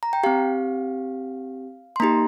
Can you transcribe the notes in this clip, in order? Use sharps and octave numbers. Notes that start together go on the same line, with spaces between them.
A#5
G5
C4 G4 F5
C6
A#3 D#4 G4 A#5